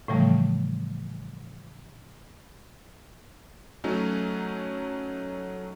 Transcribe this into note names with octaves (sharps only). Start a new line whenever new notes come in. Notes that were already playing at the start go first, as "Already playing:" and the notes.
A2 C#3 E3 F3 G3 A3
F#3 A3 C#4 D#4